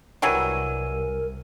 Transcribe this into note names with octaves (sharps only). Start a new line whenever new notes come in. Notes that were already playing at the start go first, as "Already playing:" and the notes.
C2 E3 F#3 G3 A#4 G#5 E6 D#7